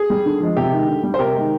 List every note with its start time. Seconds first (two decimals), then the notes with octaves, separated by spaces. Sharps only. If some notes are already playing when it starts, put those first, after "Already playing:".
Already playing: G#4
0.10 G3
0.26 D3
0.40 F3 G#3
0.57 C3 G4
0.72 D#3 G#3
0.88 D3
1.03 G3
1.14 C5
1.19 C3 G4 A#4
1.35 D#3 G#3